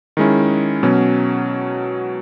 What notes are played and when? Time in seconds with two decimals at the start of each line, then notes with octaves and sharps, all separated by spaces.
0.17 D#3 G#3 C#4 E4
0.83 B2 F#3 C#4